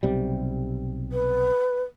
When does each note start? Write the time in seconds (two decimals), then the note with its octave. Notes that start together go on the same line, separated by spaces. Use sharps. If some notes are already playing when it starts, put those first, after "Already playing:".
0.03 B1 C3 G3
1.12 B4